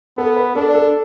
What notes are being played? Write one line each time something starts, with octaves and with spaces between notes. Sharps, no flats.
B3 A4
B4
D4 A4
A4